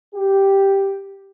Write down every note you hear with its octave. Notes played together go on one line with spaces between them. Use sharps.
G4